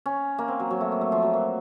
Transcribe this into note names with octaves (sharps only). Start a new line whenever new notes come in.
C#4
A#3
C4
F#3
F#3
A3
A#3
A3
F3
F#3
A#3